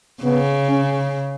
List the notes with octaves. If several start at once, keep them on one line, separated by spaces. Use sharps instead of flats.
C#3 B3
C#4